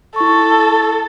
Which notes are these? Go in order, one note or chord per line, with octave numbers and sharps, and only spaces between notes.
E4 A4 C#6